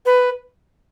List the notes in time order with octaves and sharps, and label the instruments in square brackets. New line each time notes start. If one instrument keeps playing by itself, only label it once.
[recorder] B4